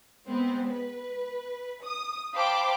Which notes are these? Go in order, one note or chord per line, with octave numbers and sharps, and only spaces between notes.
G#3 B3 C4
B4
D#6
C5 F5 G5 A5 B5 D6